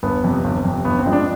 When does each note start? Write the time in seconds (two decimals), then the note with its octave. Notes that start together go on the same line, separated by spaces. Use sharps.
0.03 G1 B3
0.24 F2 C3
0.44 G1
0.65 F2 C3
0.85 G1 B3
0.99 C4
1.06 G2 F3 G#3
1.13 D4